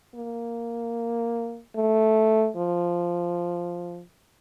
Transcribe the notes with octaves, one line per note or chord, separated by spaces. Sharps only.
A#3
A3
F3